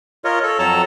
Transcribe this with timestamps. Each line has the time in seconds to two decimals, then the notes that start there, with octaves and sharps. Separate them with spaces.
0.24 F4 A#4 C#5 D#5
0.43 A4 C#5
0.59 F2 F#3 A4 A5 A#5